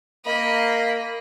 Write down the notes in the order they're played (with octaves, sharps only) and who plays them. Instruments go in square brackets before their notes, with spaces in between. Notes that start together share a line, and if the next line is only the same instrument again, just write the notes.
[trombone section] A#3 [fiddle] D#5 B5